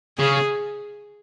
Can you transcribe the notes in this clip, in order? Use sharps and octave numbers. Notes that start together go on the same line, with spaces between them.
C#3 G#4